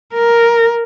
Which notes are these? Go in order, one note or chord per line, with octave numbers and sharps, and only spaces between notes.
A#4